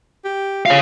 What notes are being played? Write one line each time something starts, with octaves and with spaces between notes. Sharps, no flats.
G4
F4 C#5 F5